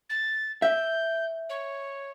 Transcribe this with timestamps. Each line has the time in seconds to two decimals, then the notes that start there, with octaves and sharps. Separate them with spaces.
0.10 A6
0.62 E5 G6
1.49 C#5